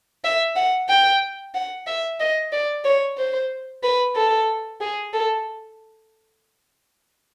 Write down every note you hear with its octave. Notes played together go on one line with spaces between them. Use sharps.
E5
F#5
G5
F#5
E5
D#5
D5
C#5
C5
B4
A4
G#4
A4